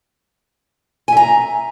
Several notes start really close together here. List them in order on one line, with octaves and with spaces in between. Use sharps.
G#5 E5 A#5